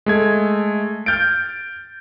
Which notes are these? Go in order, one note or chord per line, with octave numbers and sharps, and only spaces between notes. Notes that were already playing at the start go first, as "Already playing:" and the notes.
G#3 A3 G#6
F6 G6 A6 D7